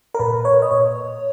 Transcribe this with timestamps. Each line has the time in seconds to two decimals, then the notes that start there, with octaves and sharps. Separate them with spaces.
0.14 A#4
0.19 A#2 B4
0.45 C#5
0.62 D#5
0.71 A#2 C#5